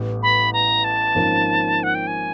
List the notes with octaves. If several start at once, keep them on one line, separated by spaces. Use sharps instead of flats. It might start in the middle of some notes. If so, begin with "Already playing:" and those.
Already playing: A1 A2 E3 G3 B3
B5
A#5
A5
G#1 G#2 F3 A#3 C#4
F#5
G5
G#5